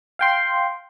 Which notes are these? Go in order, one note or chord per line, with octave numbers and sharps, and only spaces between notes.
F5 G5 C6